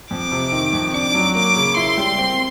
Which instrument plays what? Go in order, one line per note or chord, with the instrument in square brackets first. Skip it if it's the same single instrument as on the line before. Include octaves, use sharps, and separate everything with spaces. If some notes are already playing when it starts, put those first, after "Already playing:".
[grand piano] F2 [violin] D6
[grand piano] C3
D#3
F2
[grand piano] D4 [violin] D6
[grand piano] F#3
[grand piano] A#3 [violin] D6
[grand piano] C#3
[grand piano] E4 [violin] C6
[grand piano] G3
C4